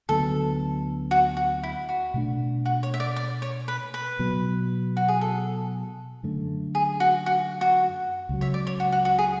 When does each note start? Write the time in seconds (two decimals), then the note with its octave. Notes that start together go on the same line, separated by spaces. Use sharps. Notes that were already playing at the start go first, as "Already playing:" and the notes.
0.09 D2 D3 F#3 B3 A4
1.11 F#4
1.37 F#4
1.63 E4
1.89 F#4
2.14 B2 A3 D4
2.66 F#4
2.83 C#5
2.94 E5
3.00 D5
3.16 D5
3.42 C#5
3.68 B4
3.94 B4
4.19 B2 F#3 B3
4.97 F#4
5.08 G#4
5.21 A4
6.23 F#2 D3 A3
6.75 G#4
7.00 F#4
7.26 F#4
7.61 F#4
8.29 C#2 C#3 F#3
8.41 C#5 E5
8.54 D5
8.67 C#5
8.80 F#4
8.92 F#4
9.05 F#4
9.18 G#4